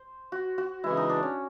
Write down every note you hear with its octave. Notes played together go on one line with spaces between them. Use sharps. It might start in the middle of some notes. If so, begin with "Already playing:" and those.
Already playing: C5
F#4
F#4
C#3 E3 G#3 E4
D#4
D4
C#4